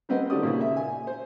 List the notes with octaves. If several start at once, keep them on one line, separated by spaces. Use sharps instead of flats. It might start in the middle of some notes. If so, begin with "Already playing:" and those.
G3 A#3 C4 B4 D#5 F#5
D#3 A3 G4 D5 D#6
A#2 C#3 A#3
E5
G#5
C5